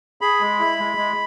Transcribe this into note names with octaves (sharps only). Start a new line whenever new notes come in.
G#4 B5
G#3
E4
G#3
G#3